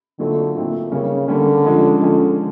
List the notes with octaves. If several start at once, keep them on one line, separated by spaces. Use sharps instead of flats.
A#2 D3 F#3 A3 C4 D#4
A#2 F#3 A3 C4 D#4
C#3 G3 A#3 C#4
D3 G3 A#3 C#4
F3 G#3 C#4
D3 F3 G#3 C#4